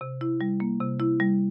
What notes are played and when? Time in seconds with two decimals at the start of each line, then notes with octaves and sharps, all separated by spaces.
0.01 C3
0.21 E4
0.41 G3
0.60 A#3
0.80 C3
1.00 E4
1.20 G3